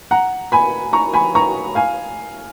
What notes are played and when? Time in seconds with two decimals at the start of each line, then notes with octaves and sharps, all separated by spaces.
0.11 F#5 A#5
0.52 G#5 B5
0.93 A#5 C#6
1.14 G#5 B5
1.35 A#5 C#6
1.75 F5 G#5